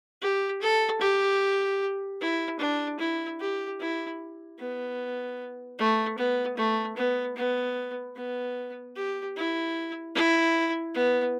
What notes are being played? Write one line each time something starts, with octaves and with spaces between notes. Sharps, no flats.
G4
A4
G4
E4
D4
E4
G4
E4
B3
A3
B3
A3
B3
B3
B3
G4
E4
E4
B3